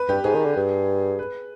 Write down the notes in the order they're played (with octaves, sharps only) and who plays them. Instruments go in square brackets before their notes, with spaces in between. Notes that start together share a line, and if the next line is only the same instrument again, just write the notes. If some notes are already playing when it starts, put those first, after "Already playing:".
Already playing: [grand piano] B4
[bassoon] G2 [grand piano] G4
[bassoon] G#2 [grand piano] G#4
[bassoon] D#3
D3
G2
[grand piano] B4